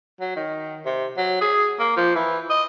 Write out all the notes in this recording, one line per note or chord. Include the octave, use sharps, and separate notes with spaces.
F#3
D#3
C3
F#3
G#4
A#3
F3
E3
D#5